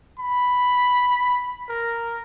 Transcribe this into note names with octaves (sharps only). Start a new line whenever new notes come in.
B5
A#4